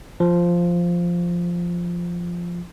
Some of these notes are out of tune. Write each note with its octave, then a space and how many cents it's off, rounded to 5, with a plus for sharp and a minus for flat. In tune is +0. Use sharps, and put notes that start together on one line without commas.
F3 -5